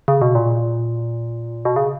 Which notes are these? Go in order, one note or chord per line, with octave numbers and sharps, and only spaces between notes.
C#3
B2
A#2
B2
C#3